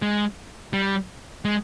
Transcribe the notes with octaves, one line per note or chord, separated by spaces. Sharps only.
G#3
G3
G#3